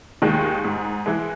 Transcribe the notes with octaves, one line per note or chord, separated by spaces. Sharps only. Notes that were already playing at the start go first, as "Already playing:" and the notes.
D#2 D#3 G#3
G#2
E3 G#3